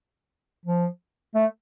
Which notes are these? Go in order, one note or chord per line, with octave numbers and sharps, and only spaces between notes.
F3
A3